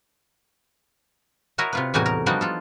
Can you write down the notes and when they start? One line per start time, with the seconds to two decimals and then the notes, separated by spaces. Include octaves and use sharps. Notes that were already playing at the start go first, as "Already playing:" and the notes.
1.58 E4 F#4 A#4 C#5 D#5 E5
1.73 C3 F4 B4
1.94 E2 A2 G3 D#4 F#4 G#5
2.06 A#4
2.26 F3 G3 B3 D4 D#4 F#4
2.41 F4 A4